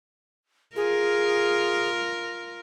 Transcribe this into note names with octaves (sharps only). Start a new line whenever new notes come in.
F4 G#4 A#4